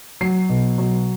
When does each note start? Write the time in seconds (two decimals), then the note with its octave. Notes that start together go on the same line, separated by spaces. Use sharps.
0.21 F#3 C7
0.49 B2
0.78 F#3